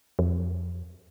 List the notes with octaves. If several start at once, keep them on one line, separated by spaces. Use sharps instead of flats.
F2